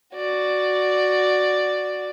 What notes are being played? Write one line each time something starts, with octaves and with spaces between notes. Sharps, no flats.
F#4 D5